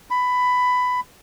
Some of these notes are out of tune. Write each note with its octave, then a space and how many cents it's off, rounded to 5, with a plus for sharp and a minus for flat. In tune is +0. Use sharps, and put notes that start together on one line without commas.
B5 +15